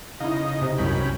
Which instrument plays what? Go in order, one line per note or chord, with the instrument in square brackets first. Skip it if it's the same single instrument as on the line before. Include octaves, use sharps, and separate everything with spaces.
[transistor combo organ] C#3 D#4 D#5 [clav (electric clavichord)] E4 F5
[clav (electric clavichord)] C3
[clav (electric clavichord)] C2 F#2 [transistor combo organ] C#4 G5 B5